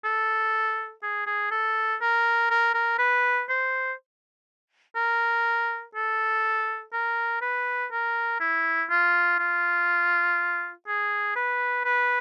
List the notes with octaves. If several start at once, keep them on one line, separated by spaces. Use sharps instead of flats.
A4
G#4
G#4
A4
A#4
A#4
A#4
B4
C5
A#4
A4
A#4
B4
A#4
E4
F4
F4
G#4
B4
B4